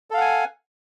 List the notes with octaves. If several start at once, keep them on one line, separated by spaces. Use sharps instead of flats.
A4 F5 F#5 G#5